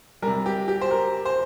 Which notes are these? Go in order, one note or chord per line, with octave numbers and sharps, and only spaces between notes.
C3 G3 A#4
G4
G4
C5
A#4
C5